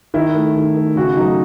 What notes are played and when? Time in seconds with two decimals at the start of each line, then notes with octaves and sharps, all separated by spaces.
0.14 D#3 E4
0.35 A3
0.56 D#3
0.76 A3
0.96 C#3 F#4
1.17 F#3 A3 D#4